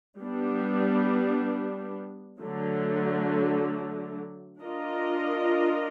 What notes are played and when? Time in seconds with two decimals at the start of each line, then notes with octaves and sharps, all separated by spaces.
0.18 G3 B3 D4
2.39 D3 F#3 A3
4.59 D4 F4 A#4 D#5